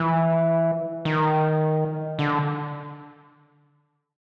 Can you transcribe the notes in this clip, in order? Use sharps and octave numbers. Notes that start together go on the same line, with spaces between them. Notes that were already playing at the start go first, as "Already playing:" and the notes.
Already playing: E3
D#3
D3